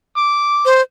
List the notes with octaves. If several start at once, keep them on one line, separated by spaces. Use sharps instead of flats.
D6
C5